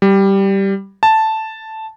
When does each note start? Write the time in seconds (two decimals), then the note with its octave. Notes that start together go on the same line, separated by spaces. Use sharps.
0.02 G3
1.03 A5